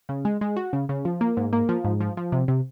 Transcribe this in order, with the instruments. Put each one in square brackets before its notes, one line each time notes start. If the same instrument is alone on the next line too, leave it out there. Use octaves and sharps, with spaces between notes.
[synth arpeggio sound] C#3
G#3
G#3
F#4
C#3
C#3
F3
A#3
G#2
A#3
F3
G#2
F3
F3
C3
C3